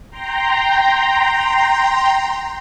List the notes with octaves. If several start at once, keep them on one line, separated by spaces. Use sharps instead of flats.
G5 A#5 C6